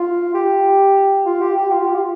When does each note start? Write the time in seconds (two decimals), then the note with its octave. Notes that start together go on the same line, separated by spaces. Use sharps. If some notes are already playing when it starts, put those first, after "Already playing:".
Already playing: F4
0.34 G4
1.26 F4
1.41 G4
1.57 G4
1.71 F4
1.87 G4
1.94 F4